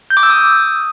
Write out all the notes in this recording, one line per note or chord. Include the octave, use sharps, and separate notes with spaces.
G6
D6
E6
D#6